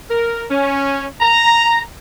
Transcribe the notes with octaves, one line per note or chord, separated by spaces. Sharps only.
A#4
C#4
A#5